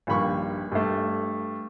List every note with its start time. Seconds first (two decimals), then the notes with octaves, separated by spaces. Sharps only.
0.07 A#1 G2 D#3 B5 C#6
0.72 G2 A3